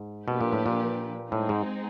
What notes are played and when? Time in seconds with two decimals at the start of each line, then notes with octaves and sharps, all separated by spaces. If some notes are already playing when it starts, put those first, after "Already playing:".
Already playing: G#2
0.27 B2 F3 A#3 D4 G4 B4
0.41 A#2
0.53 A2
0.66 A#2
1.32 A2 G#3 C4 D#4 G#4
1.49 G#2